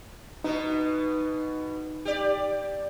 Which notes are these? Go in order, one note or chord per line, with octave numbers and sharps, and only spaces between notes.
B2 B3 D#4
G4 D5